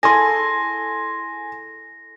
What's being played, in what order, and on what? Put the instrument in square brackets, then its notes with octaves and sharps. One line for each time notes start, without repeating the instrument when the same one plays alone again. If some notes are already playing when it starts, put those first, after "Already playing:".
[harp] E4 G#4 A4 [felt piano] G#5 C6 [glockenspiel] A#6